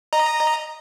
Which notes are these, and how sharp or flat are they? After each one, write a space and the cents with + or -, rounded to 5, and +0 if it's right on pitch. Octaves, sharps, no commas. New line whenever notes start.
D#5 -15 A#5 +0